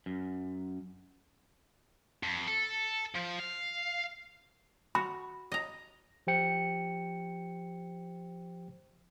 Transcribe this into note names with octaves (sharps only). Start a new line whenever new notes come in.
F#2
F2
A4
F3
F5
F#4 B5
D#5 A#5
F3 G4 C5 G5 C#7